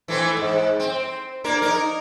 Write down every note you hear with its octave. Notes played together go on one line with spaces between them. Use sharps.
E3 A3 C4
G#2
C4
A#3 D4 A#4
D#4 A#4